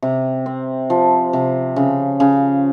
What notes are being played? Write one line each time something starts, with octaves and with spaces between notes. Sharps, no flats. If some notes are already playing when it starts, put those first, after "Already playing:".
C3
C4
F3
C3
C#3
C#3